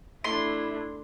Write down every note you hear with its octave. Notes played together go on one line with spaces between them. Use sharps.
A3 D4 E4 C6